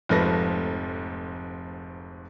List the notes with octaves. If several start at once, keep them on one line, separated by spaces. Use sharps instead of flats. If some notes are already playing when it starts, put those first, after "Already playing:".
F1 G#2 F3 A3 B4 A#6